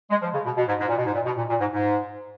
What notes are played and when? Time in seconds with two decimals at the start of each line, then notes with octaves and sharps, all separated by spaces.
0.10 G#3
0.22 F3
0.34 C#3
0.45 B2
0.57 B2
0.68 G#2
0.80 G#2
0.89 A#2
0.97 B2
1.06 G#2
1.14 A#2
1.25 B2
1.37 A#2
1.50 A#2
1.60 G#2
1.73 G#2